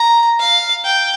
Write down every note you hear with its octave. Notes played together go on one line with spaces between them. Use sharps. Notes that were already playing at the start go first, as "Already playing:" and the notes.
Already playing: A#5
F5
G5